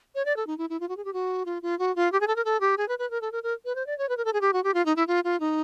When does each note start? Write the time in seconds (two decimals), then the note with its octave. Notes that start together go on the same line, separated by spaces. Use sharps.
0.15 C#5
0.25 D5
0.37 A4
0.47 D#4
0.58 E4
0.70 E4
0.80 F4
0.89 F#4
0.97 G#4
1.05 G4
1.14 F#4
1.46 F4
1.62 F4
1.79 F#4
1.96 F4
2.12 G4
2.21 G#4
2.28 A4
2.36 A#4
2.45 A4
2.60 G4
2.78 G#4
2.89 B4
2.99 B4
3.11 A#4
3.21 A4
3.32 A#4
3.43 A#4
3.65 B4
3.76 C5
3.87 D5
3.98 C#5
4.09 B4
4.17 A#4
4.25 A4
4.33 G#4
4.41 G4
4.53 F#4
4.64 G4
4.74 F4
4.86 D#4
4.96 E4
5.08 F4
5.24 F4
5.40 D#4